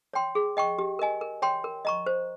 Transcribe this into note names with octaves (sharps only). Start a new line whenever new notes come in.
C#5 G5 C6
G#4
D#5 G5 C#6
G4
A#4 D#5 G#5
A#4
C#5 G5 C6
A#4
D#5 A#5 C#6
C5